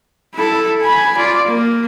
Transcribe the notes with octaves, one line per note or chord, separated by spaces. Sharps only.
E4 A4
G#5 B5
F4 D5
A#3